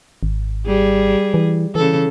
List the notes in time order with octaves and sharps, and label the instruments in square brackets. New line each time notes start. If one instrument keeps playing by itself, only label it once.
[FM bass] G#1
[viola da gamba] G3 G#4
[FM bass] E3
[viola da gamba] C#3 A4 [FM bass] E3